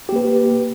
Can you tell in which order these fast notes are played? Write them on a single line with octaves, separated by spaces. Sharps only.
G4 A#3 B4